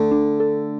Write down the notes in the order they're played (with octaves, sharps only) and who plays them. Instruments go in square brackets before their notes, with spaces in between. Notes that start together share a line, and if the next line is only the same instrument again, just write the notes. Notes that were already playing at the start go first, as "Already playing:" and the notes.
Already playing: [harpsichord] D3 [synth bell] A3 D4
[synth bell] D4
A4